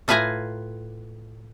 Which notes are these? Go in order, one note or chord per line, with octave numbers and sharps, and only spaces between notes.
A2 F4 B4 F5 G#5 A#5